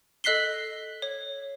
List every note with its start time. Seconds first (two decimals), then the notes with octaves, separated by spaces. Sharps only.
0.24 A4 D#5 F#6 B6 C7 G7
1.02 C#5